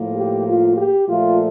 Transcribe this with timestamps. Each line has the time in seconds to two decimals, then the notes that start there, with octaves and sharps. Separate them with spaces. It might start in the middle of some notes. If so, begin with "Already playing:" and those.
Already playing: A2 F3 A#3
0.16 G4
0.47 F4
0.78 G4
1.08 A#2 F3 A3 F4